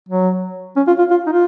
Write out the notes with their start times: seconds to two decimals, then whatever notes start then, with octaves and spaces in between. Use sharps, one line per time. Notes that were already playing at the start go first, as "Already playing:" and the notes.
0.09 F#3
0.76 C#4
0.87 F4
0.99 F4
1.11 F4
1.27 D#4
1.32 F4